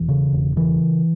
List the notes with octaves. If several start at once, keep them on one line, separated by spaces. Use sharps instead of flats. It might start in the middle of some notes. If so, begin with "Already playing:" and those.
Already playing: E1 E3
C#3
E1
C#3 E3